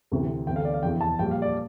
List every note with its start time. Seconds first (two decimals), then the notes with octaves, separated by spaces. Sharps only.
0.12 D2 C3 E3
0.47 E1 D2 D3 G5
0.56 F5
0.65 D5
0.74 F5
0.83 F1 E2 E3 G5
1.01 A5
1.19 A#1 A#2 G3 G5
1.31 F5
1.42 D5